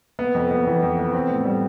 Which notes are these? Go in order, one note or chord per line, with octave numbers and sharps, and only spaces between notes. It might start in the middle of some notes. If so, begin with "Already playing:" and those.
B3
F2
B3
E3
F2
B3
C4
A2
G3